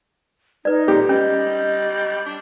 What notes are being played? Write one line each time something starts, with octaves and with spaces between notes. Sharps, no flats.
D#4 B4 D5
D3 G4
G3 C#4 D#5
D4